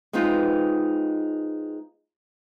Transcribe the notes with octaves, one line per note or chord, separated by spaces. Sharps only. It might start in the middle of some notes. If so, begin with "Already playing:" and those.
G#3 B3 C4 D#4 F4